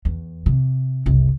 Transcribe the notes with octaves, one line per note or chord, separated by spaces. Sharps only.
E2
C3
F#1 C2